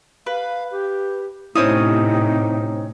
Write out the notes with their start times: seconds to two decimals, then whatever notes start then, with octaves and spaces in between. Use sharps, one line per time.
0.26 B4 F5
0.71 G4
1.55 A2 C3 C4 C#4 D#4 E4 D#6